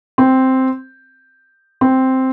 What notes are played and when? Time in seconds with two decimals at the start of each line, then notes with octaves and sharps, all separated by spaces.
0.18 C4
1.81 C4